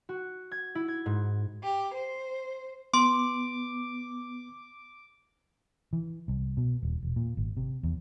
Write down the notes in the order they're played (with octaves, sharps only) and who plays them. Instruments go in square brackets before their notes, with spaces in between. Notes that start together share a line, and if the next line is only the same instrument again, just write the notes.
[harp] F#4
G#6
E4
G#6
G#2
[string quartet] G4
C5
[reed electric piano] B3 [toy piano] C6 [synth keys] D6
[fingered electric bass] E3
C2
B2
D#1
E1
A#2
G#1
C3
E2